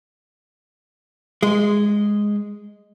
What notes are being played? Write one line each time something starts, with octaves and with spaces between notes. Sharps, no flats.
G#3